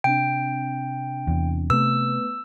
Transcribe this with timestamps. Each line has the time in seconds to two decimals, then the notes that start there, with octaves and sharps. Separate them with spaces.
0.04 C3 C4 D4 G5
1.27 E2
1.70 C3 A3 B3 B4 E6